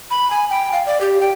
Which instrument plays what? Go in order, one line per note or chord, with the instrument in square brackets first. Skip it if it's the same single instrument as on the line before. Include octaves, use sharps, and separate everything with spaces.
[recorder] B5
G#5
G5
F5
D5
G4
G5